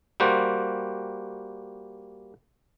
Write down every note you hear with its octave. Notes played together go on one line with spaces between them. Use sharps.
G3 A#3 F#4 C5